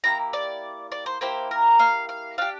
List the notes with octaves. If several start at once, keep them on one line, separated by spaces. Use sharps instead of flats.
A#3 E4 G4 A#5
D5
D5
C5
A#3 E4 G4 C5
A#4
F5
F5
D4 G4 F5